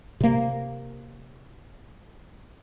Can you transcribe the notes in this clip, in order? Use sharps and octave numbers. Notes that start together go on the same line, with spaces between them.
C3 A#3